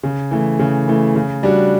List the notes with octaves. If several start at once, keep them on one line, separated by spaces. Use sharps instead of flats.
C#3
E3 A3
C#3
E3 A3
C#3
G3 D4 F#4